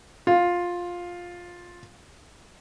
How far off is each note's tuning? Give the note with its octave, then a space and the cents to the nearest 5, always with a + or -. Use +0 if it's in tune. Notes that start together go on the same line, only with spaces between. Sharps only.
F4 +10